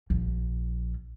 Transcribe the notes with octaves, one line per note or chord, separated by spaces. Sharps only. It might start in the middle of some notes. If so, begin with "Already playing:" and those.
A#1 F3